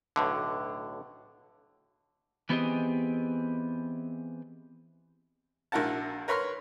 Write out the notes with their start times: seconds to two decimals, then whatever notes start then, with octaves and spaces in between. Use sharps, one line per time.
0.16 B1 A2 D3
2.49 E3 B3 C4 G4 G#4 D#5
5.72 A#1 E4 F#4 A#4 F#5 A5
6.28 A#4 B4 C#5 B5 C6 F6